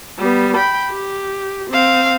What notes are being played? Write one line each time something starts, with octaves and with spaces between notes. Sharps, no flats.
G3 B3
G5 B5
G4
C4 F5